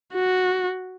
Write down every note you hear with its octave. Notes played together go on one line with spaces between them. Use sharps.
F#4